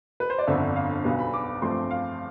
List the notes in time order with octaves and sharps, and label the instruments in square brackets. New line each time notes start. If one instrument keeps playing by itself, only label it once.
[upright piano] B4
C5
D5
G1 F2 D3 E5
F5
B1 B2 G3 B3
B5
D6
G2 F3 A3 C4 C6
F5